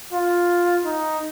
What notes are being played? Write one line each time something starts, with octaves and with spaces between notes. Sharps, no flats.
F4
D#4